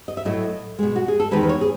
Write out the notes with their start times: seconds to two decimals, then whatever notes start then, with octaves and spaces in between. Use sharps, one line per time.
0.08 D#5
0.17 E5
0.25 A2 F#3 A3 D#5
0.79 B2 G#3
0.96 F#4
1.08 G#4
1.20 A4
1.31 E2 D#3 G#3 B4
1.43 B4
1.49 C#5
1.61 G#4